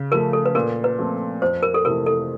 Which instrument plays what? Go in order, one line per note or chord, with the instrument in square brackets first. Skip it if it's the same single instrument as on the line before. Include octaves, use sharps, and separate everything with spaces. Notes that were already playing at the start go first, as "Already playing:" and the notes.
Already playing: [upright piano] C#3
[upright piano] F3 A3 [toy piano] A#4
[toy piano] A4
B4
[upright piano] A#2 [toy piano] A#4
[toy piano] B4
[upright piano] F3 A3 C4
[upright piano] F2 [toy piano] C5
[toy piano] A#4
A4
[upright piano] C3 E3 A3 [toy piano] A#4
[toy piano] A4